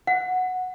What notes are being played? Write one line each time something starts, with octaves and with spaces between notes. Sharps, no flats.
F#5